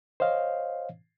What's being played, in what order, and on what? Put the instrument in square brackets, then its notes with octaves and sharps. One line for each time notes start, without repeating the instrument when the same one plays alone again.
[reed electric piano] C5 C#5 D#5 F5